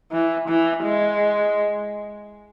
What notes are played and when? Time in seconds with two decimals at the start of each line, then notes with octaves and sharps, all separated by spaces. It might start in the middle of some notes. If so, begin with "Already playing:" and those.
0.12 E3
0.48 E3
0.83 G#3